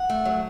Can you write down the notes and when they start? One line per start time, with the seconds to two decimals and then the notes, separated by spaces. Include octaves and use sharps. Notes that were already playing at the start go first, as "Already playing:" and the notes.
Already playing: F#5
0.10 A3
0.25 F#3